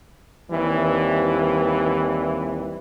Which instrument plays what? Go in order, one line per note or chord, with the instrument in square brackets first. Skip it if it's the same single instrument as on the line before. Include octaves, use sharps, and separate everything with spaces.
[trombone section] D#2 E3 G3 C4 E4